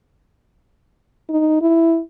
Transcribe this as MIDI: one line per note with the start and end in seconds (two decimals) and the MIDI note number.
1.29 1.60 63
1.61 2.00 64